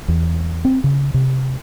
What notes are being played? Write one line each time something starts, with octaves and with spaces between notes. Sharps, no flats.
E2
C4
C#3
C3